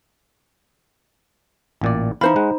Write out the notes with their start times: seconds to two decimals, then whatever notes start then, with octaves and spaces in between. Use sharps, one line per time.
1.81 A1 A#2 D5
2.21 E3 D#4 C5 F5 B5
2.36 G#3 F#5